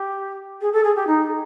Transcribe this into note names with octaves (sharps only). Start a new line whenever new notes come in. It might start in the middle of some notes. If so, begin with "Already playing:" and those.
Already playing: G4
G#4
A4
G#4
G4
D#4